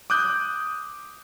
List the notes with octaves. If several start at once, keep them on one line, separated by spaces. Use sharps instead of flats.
D6 D#6 F#6 G6